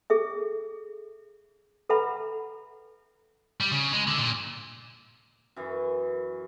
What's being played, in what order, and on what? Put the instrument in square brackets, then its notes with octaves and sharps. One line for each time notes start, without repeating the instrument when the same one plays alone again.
[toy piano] G#4 A4 E5
A4 B4 E5 F#5 A#5 B5
[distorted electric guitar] G3
C#3
G#3
D3
A#2
[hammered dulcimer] F#2 E3